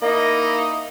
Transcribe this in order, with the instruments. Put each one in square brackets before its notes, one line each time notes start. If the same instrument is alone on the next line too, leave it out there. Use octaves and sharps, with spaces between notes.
[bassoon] A#3 [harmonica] D#4 E4 D#5